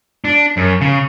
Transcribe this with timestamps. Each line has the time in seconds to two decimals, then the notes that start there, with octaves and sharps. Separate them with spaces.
0.25 D4
0.57 F#2
0.81 C#3